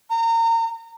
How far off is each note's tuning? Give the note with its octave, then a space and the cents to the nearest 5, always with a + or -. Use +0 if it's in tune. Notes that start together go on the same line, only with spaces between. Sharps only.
A#5 -30